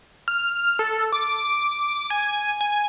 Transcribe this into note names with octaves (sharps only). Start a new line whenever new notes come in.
F6
A4
D6
G#5
G#5